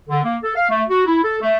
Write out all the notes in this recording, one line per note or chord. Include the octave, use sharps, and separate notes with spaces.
D3
A#3
A4
F5
A3
F#4
E4
A4
A3